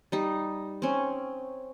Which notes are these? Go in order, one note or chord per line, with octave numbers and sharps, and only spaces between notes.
G3 D#4
C4 C#4